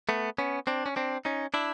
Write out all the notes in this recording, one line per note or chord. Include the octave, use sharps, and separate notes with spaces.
A3 B3
B3 C#4
C4 D4
C#4
C4 D4
C#4 D#4
D4 E4